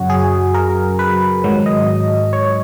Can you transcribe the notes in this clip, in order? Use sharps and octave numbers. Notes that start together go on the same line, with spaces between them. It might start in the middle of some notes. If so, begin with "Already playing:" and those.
Already playing: F#2 C#3 F#3 F#4
G#4
A#4
B4
G#2 D#3 F#3
D#5
C#5